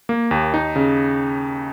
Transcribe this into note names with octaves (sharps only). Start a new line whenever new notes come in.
A#3
D#2
D#4
C#3